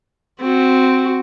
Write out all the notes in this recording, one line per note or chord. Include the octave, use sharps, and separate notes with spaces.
C4 F#4